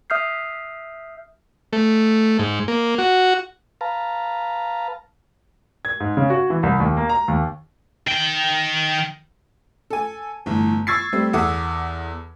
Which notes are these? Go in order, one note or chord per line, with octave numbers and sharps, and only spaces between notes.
E5 D#6 F6 G6 C7
A3
G#2
A#3
F#4
B4 F5 A5 A#5
G#6
G#2
C#3
F#4
E3
C2
D#2
A#3
A#5
D#2
D#3 G5
A4 G#5
G1 A2 E3
C#6 E6 G#6 A6 C7
G3 A3 C4
E2 A4 E5 F#5 D6 D#6